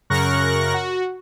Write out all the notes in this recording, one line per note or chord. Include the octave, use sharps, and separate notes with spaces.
F#2 C#3 A#4 C#6 F#6 A#6
F#4